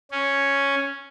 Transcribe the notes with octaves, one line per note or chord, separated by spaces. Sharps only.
C#4